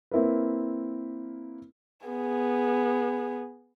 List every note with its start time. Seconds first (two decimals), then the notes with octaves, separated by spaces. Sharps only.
0.11 A#3 C4 E4 A#4 B4
2.07 B3 G#4